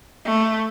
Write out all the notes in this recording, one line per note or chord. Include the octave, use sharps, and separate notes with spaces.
A3